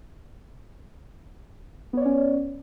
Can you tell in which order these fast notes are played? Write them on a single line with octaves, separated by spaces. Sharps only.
B3 C#5 D5 C#4